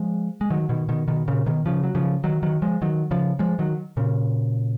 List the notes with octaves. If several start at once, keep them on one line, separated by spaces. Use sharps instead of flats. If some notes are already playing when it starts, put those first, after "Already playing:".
Already playing: F3 G#3
G#3
D#3 F#3
B2 D#3
B2 D#3
B2 D#3
A#2 C#3
B2 D#3
C#3 F3
F#3
C#3 F3
D#3 F#3
D#3 F#3
F3 G#3
D#3 F#3
C#3 F3
F3 G#3
D#3 F#3
A#2 C#3